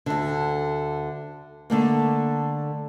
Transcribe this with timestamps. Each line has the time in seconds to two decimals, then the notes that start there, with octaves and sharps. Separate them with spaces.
0.06 D2 D3
1.70 D3 A3 A#3